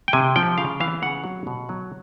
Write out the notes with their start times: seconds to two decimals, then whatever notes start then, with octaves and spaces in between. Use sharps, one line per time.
0.08 G5
0.13 C3 G#5
0.36 F3 G5
0.58 C#3 F5
0.80 E3 F5
1.02 C#3 F#5
1.24 F#3
1.47 B2
1.69 F#3